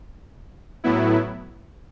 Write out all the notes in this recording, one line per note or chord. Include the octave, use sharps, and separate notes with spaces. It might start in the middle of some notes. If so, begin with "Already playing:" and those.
A2 F#3 B3 E4